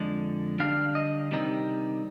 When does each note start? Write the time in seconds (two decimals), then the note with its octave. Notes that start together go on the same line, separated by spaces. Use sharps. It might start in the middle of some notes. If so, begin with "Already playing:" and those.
Already playing: F2 D3 F3 G#3
0.59 D3 G3 D4 F5
0.95 D#5
1.31 C3 D#3 G3 C4 D#4